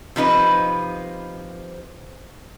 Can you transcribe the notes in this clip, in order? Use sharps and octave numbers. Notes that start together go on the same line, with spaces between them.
C3 F3 D#4 B4